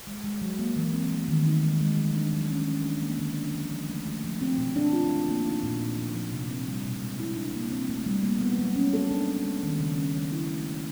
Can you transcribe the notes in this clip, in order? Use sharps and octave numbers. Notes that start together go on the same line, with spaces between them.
G#3
G#3
F#3
A#3
E3
C4
A3
D#3
D#4
G#3
G#3
F3
D4
F#3
C#4
C#4
D4
A#3
D3
D4
F3
F3
A3
A3
F3
C4
B2
D4
F4
A3
A#3
D#4
A#2
A#2
F3
F3
C3
C4
G3
B2
G#3
E4
D4
A#3
C4
A3
G3
A#3
B3
F#3
C#4
A4
D4
D4
G#3
D#3
C#3
C#4
F#3
E4
A3
A3